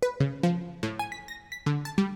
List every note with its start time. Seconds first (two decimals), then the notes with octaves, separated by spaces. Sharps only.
0.02 B4
0.20 C#3
0.43 F3
0.83 A2
0.99 G#5
1.12 B6
1.28 A#6
1.52 B6
1.66 D3
1.85 A5
1.98 G3